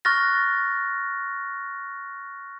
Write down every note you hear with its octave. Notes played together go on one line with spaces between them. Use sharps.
C#6 F6 F#6 A6 A#6